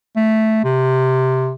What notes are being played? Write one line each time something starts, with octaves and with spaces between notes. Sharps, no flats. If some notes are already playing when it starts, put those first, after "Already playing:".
A3
C3